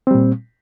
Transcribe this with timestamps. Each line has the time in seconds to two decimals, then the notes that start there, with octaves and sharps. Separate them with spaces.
0.07 C4
0.11 G3
0.14 A#2